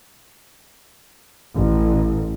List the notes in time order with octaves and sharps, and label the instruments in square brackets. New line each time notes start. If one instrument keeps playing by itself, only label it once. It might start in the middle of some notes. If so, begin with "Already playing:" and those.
[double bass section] A1